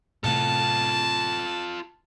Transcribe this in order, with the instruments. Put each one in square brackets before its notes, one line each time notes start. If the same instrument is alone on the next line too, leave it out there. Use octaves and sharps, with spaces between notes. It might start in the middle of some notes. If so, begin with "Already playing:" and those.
[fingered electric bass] A2 C3 A3 [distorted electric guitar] F4 A4 [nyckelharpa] A5